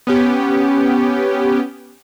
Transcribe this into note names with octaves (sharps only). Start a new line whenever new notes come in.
B3 C#4 G4